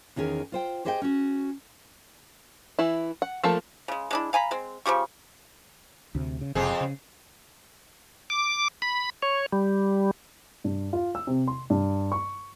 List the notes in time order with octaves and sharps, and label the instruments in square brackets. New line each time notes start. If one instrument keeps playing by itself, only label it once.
[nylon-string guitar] E2 D#3 C#4 G#4
F4 C5 G5
G4 G#4 C5 D#5 F#5 G5
C#4 F#4
[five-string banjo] E3 E4
F#5
F3 A3 A#3 A4
[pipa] C#3 G#3
G#3 D4 E4
F5 G#5 A#5 B5
G#3 C4
C#3 F3 G4 C#6
[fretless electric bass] D2 C3
C#3
[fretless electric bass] F#1 C3 [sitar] F2 C4 G#4
[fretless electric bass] C#3
[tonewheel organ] D6
B5
C#5
G3
[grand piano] G2
F4
E6
C3
C6
G2
C#6